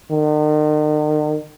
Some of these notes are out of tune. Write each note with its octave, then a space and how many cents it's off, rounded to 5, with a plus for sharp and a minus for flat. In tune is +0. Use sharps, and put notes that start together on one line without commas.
D#3 -45